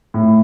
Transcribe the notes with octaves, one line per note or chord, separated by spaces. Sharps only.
A2